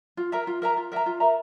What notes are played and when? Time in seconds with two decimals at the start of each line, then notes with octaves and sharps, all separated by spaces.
0.17 F4
0.32 A#4 E5 A#5
0.47 F4
0.62 A#4 E5 A#5
0.77 F4
0.92 A#4 E5 A#5
1.06 F4
1.20 A#4 E5 A#5